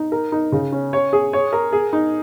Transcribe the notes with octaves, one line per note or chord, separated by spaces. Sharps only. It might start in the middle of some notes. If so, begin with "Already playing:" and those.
Already playing: D#4
A#4
D#4
C#3
C#4
C#5
G#4
C#5
A#4
G#4
D#4